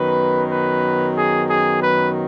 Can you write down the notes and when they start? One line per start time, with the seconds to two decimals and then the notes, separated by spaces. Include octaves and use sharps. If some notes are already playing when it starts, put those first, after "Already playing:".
Already playing: F#2 D#3 F#3 B3 B4
0.52 B4
1.18 G#4
1.50 G#4
1.83 B4